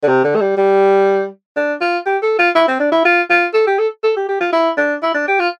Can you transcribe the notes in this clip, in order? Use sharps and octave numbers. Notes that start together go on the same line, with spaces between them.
D3
C3
D3
A3
G3
G3
D4
F4
G4
A4
F4
E4
C4
D4
E4
F4
F4
A4
G4
A4
A4
G4
G4
F4
E4
D4
E4
D4
G4
F4